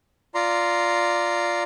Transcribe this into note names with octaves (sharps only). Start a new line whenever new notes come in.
F4 D5 A#5 C6